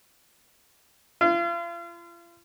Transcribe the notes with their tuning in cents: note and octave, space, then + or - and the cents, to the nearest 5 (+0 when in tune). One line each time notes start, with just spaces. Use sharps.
F4 -40